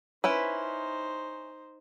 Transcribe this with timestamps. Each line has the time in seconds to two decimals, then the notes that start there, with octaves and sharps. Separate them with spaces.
0.24 C#4 D#4 E4 B4 C5